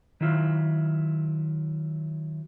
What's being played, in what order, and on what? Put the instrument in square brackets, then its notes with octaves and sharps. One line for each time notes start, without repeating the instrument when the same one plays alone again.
[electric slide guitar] D#3 F#3 E4 F4